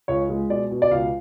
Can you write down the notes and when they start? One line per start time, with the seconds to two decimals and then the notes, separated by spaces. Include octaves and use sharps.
0.08 C#2 C#5
0.30 G#3
0.49 B2 D5
0.71 B2
0.82 D5
0.91 C#2 F5